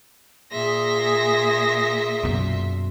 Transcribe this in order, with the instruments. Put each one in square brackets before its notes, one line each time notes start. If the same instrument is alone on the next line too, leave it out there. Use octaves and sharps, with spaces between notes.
[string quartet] A#2 E5 C6 [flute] G#4 [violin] A#6
[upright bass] F#2 B2